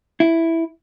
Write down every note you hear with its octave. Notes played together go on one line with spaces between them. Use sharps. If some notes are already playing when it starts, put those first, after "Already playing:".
E4